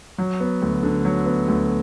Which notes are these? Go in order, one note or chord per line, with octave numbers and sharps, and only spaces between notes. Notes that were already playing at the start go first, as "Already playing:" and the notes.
F#3
B3
D2
D3
F#3
B3
D2